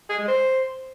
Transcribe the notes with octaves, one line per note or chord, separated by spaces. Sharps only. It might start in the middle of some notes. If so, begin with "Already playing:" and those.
G#4
G#3
C5